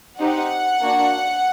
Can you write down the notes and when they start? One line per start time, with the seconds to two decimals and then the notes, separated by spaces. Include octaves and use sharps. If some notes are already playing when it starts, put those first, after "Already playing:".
0.19 C4 D#4 G4 F#5
0.81 A#3 D4 F#4